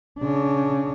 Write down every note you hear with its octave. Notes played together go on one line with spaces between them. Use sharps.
C#3 D4